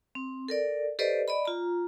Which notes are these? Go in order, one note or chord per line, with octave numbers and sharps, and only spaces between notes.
C4
A4 A#4 D5
G4 A4 B4 C5 D5 D#5
D5 D#5 B5
F4 A#5